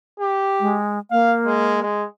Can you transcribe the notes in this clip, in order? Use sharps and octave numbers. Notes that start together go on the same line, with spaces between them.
G4
G#3
A#3 F5
G#3
G#3